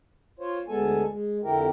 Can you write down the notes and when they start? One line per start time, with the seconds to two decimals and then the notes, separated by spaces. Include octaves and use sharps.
0.39 F4 C5 C#5
0.68 D2 G#3 B3 A4 G#5
1.09 G#3
1.43 F2 D3 C4 E4 G4 A#4